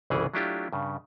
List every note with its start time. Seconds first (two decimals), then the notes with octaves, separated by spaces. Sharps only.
0.10 G1 C2 C#3 E3 E4 G#4
0.34 F#3 A3 D4 E4 F4 G4
0.73 G2 C#3